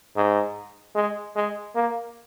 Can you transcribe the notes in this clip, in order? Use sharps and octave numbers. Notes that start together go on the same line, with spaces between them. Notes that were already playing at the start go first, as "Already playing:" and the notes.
G#2
G#3
G#3
A#3